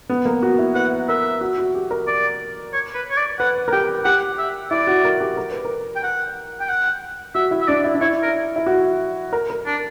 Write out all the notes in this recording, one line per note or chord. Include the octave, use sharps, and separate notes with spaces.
B3
A#3
F#4
E4
B4 F#5
A#4 E5
F#4
F#4
G4
A#4
D5
C#5
B4
C#5
D5
B4 F#5
A#4
G4 G5
G4 F#5
E5
E4 D5
F#4
A#4
G4
A#4
B4
A#4
G5
F#5
G5
F#5
F#4 E5
E4
E5
D4 D5
E4
D4
E4 C#5
A#4
E4
F#4
A#4
A#4
D4